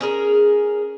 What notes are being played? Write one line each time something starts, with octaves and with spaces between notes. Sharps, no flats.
C#4 G#4 A#4